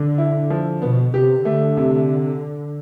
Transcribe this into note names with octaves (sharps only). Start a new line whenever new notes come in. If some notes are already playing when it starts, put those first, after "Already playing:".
Already playing: D3 D4
E4
F3
B2 B3
C3 G4
D3 A3
C3